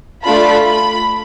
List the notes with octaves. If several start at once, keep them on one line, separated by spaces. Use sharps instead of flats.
A3 D4 F4 B5
B5